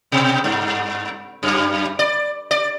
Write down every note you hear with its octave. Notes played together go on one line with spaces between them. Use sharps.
B2
G2
F#2
D5
D5